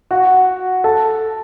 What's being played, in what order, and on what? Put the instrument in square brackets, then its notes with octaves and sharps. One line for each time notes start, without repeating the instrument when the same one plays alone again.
[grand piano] F#4 F#5
A4 A5